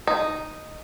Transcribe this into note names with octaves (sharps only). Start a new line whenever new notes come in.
D#4